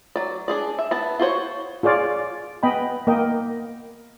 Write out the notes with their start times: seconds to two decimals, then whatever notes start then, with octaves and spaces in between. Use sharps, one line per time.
0.16 F#3 D5
0.48 D4 G#4 D5
0.79 E5
0.91 B3 A5
1.19 F4 F#4 C5 C#5
1.83 F4 G#4 C#5 D5 F5
2.63 B3 D#5 G5 B5
3.07 A#3 A#4 D#5 G5